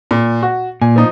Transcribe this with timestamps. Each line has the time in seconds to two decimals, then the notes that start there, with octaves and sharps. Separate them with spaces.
0.11 A#2
0.42 F#4
0.81 A#2 G#5
0.96 F3 D#4